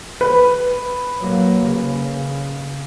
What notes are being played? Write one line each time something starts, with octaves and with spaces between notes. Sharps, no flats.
B4
F#3 A#3
C#3